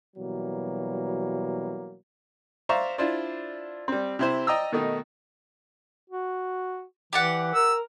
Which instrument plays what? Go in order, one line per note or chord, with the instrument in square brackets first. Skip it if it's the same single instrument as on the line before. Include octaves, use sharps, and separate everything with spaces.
[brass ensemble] B2 E3 F#3 G3 A#3
[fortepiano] C5 D5 E5 F5 A#5 C#6
D4 E4 F4 C5 D5
G3 C4
C3 E4 C5
D5 D#5 G5 A#5 D#6 E6
B2 D#3 A3 D#4
[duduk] F#4
[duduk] E3 [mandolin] G4 D5 F#5
[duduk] A#4 [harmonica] E6